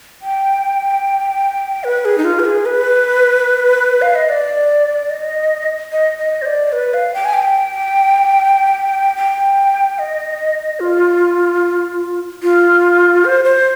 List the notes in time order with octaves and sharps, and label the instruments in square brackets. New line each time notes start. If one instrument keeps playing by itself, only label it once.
[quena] G5
B4
G#4
D#4
F4
B4
G#4
B4
F5
D#5
D5
D#5
D#5
D#5
C5
D5
B4
F5
G5
G#5
G5
G5
D#5
F4
F4
C5
C5